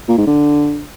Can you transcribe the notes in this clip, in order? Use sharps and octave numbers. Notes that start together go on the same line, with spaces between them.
A#2
G#2
D3